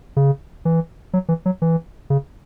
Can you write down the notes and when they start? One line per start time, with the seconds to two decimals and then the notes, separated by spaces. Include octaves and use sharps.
0.16 C#3
0.65 E3
1.13 F#3
1.29 E3
1.46 F#3
1.62 E3
2.10 C#3